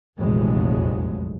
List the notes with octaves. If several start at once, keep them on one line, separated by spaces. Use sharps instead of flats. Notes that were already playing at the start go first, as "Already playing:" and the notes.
F1 A#1 E2 F3 F#3 G#3